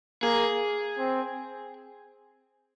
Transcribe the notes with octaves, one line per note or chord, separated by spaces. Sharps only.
A#3 G#4
C4